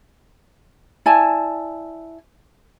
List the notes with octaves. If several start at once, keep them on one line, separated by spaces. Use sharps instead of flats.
E4 D5 G#5 A5